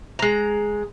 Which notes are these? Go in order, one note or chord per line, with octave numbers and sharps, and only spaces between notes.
G#3 A#5